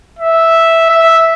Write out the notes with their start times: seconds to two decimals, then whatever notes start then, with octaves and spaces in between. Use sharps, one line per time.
0.19 E5
0.90 E5